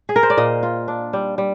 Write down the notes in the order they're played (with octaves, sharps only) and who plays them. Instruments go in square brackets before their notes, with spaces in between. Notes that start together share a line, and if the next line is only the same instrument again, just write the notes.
[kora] G#4
A#4
C5
D5
A#2 D#5
F4
D4
G3
G3